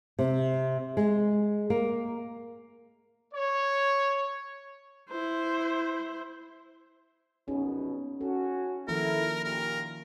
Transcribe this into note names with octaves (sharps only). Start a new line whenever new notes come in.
C3
G#3
A#3
C#5
E4 C5
A#1 F#2 B2 C#4 D#4 G#4
C#4 F#4 A4
D#3 F3 A#3 E4 A4 A#4
D#2 A#2 A#4